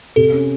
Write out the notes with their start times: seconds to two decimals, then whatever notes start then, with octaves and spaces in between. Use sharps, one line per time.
0.16 C3 A4
0.32 C#4